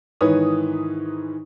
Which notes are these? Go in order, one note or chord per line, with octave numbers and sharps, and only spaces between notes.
G#2 D#3 E3 B4 C#5 D#6